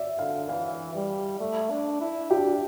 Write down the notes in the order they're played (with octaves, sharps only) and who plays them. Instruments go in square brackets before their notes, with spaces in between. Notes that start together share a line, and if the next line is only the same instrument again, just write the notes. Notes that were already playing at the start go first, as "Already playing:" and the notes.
Already playing: [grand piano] D5 E5
[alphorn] D3 [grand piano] F5
[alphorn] E3 [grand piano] F5
[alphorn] G3
A3
D4
E4
[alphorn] D4 [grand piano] G4